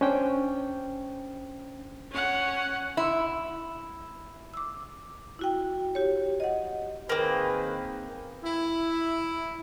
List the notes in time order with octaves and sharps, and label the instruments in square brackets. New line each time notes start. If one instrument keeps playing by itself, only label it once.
[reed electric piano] C#4 D4 C5 G5
[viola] C#4 F#5
[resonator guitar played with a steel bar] E4
[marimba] D6 E6
E4 F#4 G5
G4 C#5
D#5 F#5
[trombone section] D#3 G#4 B4 [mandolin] A#3 C4
[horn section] E4